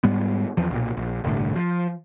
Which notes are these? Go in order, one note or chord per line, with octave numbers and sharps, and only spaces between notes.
G#2 G3 G#3 B3
E2 F3
B1 A#2
A#1
G1 C2 A2 D3
F3